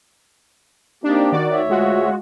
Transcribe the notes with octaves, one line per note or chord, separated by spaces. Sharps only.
A#3 C4 D4 D#4 G4
D#3 F#4 D5
D2 C#5 E5
G#3 F4 F#4